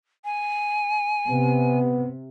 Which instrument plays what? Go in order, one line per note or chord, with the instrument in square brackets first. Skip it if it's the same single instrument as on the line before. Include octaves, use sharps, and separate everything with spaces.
[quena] G#5
[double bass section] C3 [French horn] B3